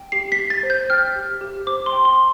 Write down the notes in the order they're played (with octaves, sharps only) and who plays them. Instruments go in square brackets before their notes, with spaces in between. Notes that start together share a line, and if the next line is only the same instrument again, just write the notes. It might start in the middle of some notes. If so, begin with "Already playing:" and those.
Already playing: [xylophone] G5
G4 C7
B6
G4
A6
C5
G6
G5 F6
G4
G4
C5 D6
C6
G5
C6